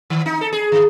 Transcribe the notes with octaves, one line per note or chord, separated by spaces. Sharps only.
D#3
D#4
A4
G#4
D3